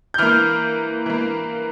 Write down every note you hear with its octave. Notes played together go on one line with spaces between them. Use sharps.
G6
E3 A#3 F6
E3 A#3